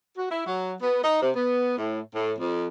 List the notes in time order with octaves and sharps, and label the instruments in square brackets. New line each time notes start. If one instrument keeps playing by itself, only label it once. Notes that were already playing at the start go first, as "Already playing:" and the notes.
[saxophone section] F#4
E4
F#3
B3
D#4
C3
B3
A2
A2
F2